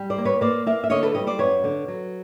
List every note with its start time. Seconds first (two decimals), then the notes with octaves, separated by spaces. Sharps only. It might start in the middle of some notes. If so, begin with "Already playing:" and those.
Already playing: G3
0.10 C5 D5
0.18 A#3
0.25 B4 C#5
0.41 A#3 C5 D5
0.66 A#3 D5 E5
0.84 E5
0.90 D3 C#5 D#5
1.03 A4 B4
1.15 G3 C#5 D#5
1.27 C5 D5
1.39 F#2 B4 C#5
1.64 D3
1.88 F#3